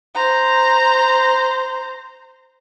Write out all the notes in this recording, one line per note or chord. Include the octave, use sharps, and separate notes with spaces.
C5 A#5